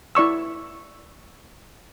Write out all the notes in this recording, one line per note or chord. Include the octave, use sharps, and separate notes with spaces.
E4 D5 C#6 E6